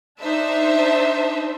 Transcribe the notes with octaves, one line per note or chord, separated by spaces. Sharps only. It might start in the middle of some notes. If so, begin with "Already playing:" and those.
D4 D#4 C5 E5 A5